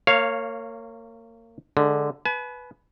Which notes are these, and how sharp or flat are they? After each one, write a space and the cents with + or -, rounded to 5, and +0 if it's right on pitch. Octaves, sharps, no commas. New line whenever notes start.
A#3 -30 C#5 -10 F5 +0
D3 +0 G#3 +20
B4 +0 G#5 +45